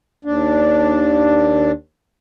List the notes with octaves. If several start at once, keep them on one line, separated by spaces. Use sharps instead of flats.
D#2 D4